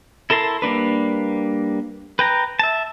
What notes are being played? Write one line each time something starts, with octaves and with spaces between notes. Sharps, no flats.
E4 A4 A#4 A5 C6
G3 A#3 D4 B4
B4 G5 A#5
E5 A5